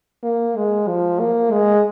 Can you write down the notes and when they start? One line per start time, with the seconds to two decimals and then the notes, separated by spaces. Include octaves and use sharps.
0.23 A#3
0.56 G#3
0.88 F3
1.20 A#3
1.52 G#3